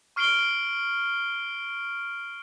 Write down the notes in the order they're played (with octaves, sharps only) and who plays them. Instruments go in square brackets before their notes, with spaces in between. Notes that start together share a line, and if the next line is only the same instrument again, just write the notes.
[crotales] C#6 F6 C7 D7 F#7 G7